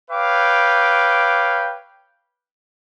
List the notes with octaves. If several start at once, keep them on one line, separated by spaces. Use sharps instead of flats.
B4 C#5 F5 G5 D6